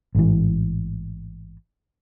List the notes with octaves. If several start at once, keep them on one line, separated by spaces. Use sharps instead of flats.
A1 G#2 E3